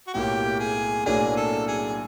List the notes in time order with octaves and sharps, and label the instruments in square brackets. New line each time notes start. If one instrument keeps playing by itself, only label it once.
[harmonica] F#4
[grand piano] B1 A2 F#3 A#3 [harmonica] G4
[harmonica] G#4
[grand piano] B1 A2 F#3 A#3 D4 [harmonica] G#4
[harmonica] A4
G#4